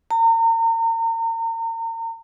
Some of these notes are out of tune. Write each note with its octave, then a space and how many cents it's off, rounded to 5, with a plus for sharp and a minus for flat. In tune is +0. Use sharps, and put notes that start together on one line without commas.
A#5 -40